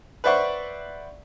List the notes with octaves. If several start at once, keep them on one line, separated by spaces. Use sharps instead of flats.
B4 C5 D5 E5 F#5 C#6